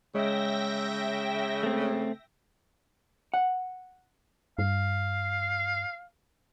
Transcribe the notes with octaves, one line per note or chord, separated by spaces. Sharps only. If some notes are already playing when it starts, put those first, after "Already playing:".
C#3 G#3 C#5 E5 G5 A#6
A3 C4
F#5
G2 F5